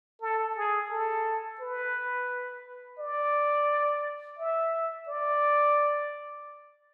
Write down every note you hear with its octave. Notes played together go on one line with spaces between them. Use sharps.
A4
G#4
A4
B4
D5
E5
D5